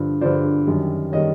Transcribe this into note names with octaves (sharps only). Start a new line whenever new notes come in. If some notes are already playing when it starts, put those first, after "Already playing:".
Already playing: G2 D3 F3
G2 D3 F3 C5 D5
F#2 D#3 G3
D#3 G3 C#5 D#5